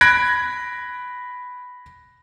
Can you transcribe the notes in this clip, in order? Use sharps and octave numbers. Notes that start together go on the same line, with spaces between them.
B5 F#6 G#6 A#6 D7